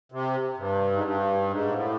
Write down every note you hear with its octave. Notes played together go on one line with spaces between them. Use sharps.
C3
G2
G#2
G2
G#2
A#2
A2